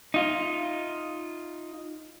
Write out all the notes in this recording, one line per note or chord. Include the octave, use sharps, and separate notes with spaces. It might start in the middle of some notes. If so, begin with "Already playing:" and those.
D#4 F4